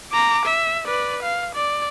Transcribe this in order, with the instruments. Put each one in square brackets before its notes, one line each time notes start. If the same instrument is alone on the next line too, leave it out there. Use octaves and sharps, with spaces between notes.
[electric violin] A#5 D6
E5
B4 D5
F5
D5